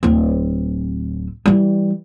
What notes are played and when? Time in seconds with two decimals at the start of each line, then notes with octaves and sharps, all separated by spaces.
0.03 D1 C4
1.46 E3 G3